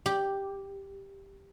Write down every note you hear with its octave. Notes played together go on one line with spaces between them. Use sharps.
G4